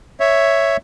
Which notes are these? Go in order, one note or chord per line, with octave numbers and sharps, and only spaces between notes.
C#5 E5